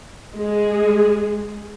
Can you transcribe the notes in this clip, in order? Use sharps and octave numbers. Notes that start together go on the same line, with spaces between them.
G#3 G#4